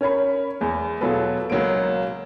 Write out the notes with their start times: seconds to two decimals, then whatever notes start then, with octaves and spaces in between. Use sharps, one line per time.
0.01 C#4 A#4 C#5 B5
0.60 E2 G#3
1.01 B2 F#3 F4 G#4 A4 B4
1.50 C#2 F#3 A#3 D7